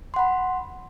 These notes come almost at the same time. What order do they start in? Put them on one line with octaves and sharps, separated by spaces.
C6 F#5 B5